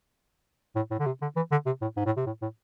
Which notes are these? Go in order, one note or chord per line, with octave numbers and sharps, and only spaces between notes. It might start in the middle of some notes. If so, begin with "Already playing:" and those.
A2
A2
D3
C3
D3
E3
D3
C3
A2
G#2
A2
C3
A2
A2